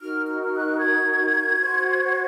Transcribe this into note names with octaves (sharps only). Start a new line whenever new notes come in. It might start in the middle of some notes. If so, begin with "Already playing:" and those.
D#4 F#4 A#4 F6
F6
F6
F#6
G#6
F#4 C5